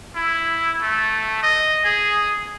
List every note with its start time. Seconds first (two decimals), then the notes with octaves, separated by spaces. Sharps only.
0.16 E4
0.81 A3
1.43 D#5
1.84 G#4